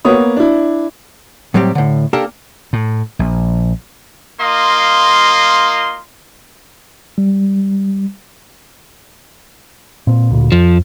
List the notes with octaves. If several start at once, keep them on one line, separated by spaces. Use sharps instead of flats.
A#3 B3 C#5 D#6
D4 E4
A2 F#3 G3 C4 G4
A2 D3
A#3 D4 G4 A4 A#4
A2
A#1
A#3 F4 D#5 C6
G3
A#2 C4
D2 A#2
F2 F3